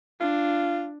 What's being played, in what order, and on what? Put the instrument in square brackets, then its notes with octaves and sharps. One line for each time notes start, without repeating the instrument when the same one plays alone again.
[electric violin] D4 [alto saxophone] F4